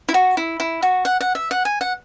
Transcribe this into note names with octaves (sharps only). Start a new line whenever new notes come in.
E4
F#4
E4
E4
F#4
F#5
F#5
E5
F#5
G#5
F#5